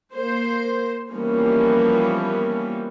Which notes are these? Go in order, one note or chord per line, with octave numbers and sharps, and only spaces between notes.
A#3 C5
E3 F3 G3 A#3 B3 C#4